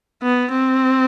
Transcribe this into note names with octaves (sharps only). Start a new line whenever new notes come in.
B3
C4